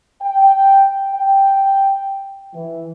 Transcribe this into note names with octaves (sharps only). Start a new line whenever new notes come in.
G5
G5
E3